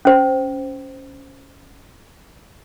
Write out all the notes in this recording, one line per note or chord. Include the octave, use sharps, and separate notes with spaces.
C#4 C5